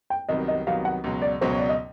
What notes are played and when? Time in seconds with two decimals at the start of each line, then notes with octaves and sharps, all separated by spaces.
0.10 G5
0.29 C2 C3 D#3 F#3 B3 D#5
0.48 D#5
0.67 C2 C3 D#3 F#3 B3 F5
0.85 F#5
1.04 C#2 B2 F#3
1.22 D5
1.41 C#2 B2 F#3 C5
1.51 C#5
1.59 D5
1.69 D#5